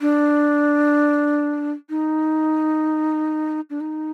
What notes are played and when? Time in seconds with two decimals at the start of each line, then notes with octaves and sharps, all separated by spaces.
0.01 D4
1.90 D#4
3.70 D4
3.80 D#4